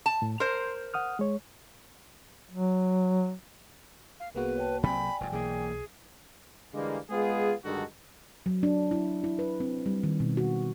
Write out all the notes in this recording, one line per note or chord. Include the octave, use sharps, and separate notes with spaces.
A5
A2
A#4 C5 C6
F#5 D#6 F6
G#3 C#5
F#3
F5
C2 A#3 B3 F#4 G#4 B4
C#5 G5 A5
C3 F#3 C4 D5 G5 G#5 B5
F1 G2
B1 E3 A#3 G#4
D3 E3 G3 G#3 A#3
G#3 B3 F4 G#4
G2 D3 D#3 G#3 F#4 A4
F#3
D4
E4
E4
B4
C4
G3
D#3
B2
F#4